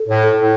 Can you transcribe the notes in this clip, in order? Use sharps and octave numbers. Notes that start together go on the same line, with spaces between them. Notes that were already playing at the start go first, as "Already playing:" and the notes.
Already playing: A4
A2
A4
A2